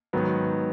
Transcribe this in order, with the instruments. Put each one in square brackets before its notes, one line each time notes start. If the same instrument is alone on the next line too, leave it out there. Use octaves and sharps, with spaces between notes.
[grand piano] G#2 D#3 F#3 B3